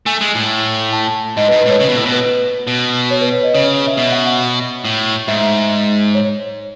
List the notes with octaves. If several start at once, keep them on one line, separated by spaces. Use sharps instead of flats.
A3 G#5
G#3
A2
A5
G#2 D#5
B4
G#2
B4
A2 C#5
C#3
B2
A2
B4
B2
B4
B2
C#5
B4
C#5
D#5
C#3 C#5
C#5
E5
B2
F#5
F#5
A2
G#2 E5
C#5